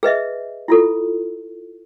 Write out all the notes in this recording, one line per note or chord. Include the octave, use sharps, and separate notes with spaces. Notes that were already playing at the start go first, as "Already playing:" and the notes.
G#4 B4 D#5 E5
E4 F4 A4